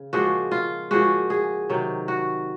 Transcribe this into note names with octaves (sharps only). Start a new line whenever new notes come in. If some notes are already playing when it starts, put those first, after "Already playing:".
Already playing: C#3
A#2 F3 G#3 F#4
F4
A#2 F3 G#3 F#4
G#4
C3 D#3 F#3
F#4